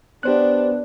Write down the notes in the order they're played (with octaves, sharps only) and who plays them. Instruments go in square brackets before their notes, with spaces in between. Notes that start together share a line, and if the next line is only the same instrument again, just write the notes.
[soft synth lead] B3 [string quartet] D4 [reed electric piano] G4 C5 F#6